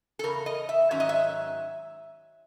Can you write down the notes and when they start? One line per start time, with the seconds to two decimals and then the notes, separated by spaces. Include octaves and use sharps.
0.19 A4
0.24 E2 C#3 A#4
0.46 D#5
0.69 E5
0.91 G#2 D#3 F#3 C#4 E5
1.00 D#5
1.09 E5